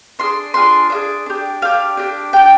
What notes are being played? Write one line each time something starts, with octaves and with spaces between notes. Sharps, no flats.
D4 F4 G#4 C6
D4 F4 G#4 C6
D4 F4 G#4
D4 G4
D4 G4 F5
D4 G4
D4 G4 G5